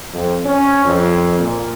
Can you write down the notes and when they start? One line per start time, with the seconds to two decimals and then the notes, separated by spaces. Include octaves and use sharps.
0.12 F2
0.46 C#4
0.84 F2
1.38 A#2